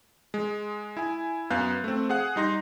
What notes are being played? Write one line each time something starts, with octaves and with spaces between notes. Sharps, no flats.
G#3
E4 G#5
F#2 B3 F5 F#6 G6
A3 C4
G#4 F5 F#5 F#6
G3 D#4 C6 A#6